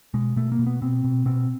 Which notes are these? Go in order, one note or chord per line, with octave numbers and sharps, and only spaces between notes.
B2 G#3
B2 A3
A#3
B2
B3
B2 C4
B2
B2 C4